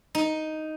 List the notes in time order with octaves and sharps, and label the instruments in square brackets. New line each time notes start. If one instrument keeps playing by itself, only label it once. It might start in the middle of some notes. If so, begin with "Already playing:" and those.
[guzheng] D#4